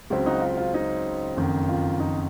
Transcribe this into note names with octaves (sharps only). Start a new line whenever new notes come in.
C#2 C#3 F#3 C4
D#4 F#4
F4
F4
D#4
F#1 F2 D#3
F4
D#4